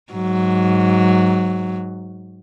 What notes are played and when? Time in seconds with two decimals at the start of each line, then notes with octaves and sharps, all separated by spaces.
0.13 G#2 F#3